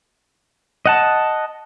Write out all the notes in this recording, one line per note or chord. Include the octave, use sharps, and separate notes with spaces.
D#5 F#5 A5